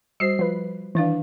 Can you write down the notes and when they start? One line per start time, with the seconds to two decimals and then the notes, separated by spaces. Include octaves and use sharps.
0.20 G3 F#4 C5 C7
0.39 F3 B4
0.95 D#3 E3 D4 B4 F5